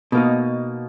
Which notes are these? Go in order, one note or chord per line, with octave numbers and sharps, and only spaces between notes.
B2 A#3 D#4